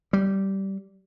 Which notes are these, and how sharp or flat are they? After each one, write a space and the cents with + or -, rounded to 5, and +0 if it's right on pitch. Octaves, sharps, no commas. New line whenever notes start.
G3 -15